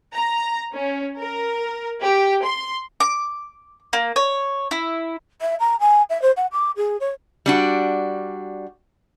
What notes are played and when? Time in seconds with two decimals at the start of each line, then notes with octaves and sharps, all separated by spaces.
0.13 A#5
0.73 C#4
1.19 A#4
2.02 G4
2.44 C6
3.00 D6
3.93 A#3
4.16 C#5
4.71 E4
5.41 E5
5.60 A#5
5.80 G#5
6.10 E5
6.22 C5
6.37 F#5
6.52 D6
6.76 G#4
7.00 C#5
7.46 G3 D4 F#4